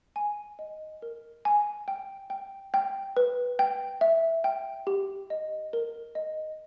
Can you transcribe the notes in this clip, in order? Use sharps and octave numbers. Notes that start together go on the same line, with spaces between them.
G#5
D#5
A#4
G#5
G5
G5
G5
B4
G5
E5
G5
G4
D#5
A#4
D#5